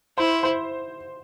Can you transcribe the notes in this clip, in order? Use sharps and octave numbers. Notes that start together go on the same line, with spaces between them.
E4 C5
C5